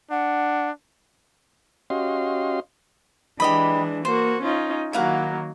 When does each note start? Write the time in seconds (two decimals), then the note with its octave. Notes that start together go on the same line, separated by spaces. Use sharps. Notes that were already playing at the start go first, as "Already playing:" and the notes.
0.11 D4 F#5
1.90 C#4 F#4 G4 D#5 F5 C6
3.40 E3 G#3 D4 G4 D#5 B5
4.05 A#3 F#4 C5
4.43 C#4 D#4 F4
4.93 D#3 F#3 A#3 E4 F5 F#5